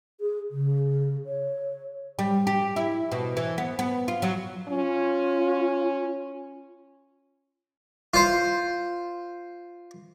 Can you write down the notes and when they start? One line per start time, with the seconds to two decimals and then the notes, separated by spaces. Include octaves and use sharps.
0.21 G#4
0.51 C#3
1.26 C#5
2.19 G3
2.47 G4
2.76 E4
3.12 B2
3.37 E3
3.58 B3
3.79 B3
4.08 F4
4.22 F#3
4.69 C#4 F4
8.14 F4 C5